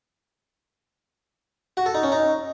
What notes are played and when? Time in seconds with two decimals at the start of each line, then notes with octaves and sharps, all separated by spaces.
1.77 F#4
1.86 A4
1.95 D#4
2.03 C#4
2.12 D#4